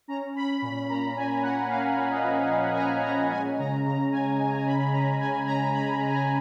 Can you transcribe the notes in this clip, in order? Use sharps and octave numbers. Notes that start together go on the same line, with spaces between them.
C#4 A#5
C#4 B5
A#2
B5
A#3 A#5
A#2 G#5
A#3 F#5
A#3 F5
A#2
D#5
F3
A#2 F5
G#5
A#2 A#5
C#4 A#5
G#3 G#5
C#3 A#5
C#3 A#5
C#4 G#5
G#3 G#5
A#5
G#5
C#4 B5
C#4 A#5
C#4 G#5
G#3 A#5
C#3 B5
G#3
G#5
A#5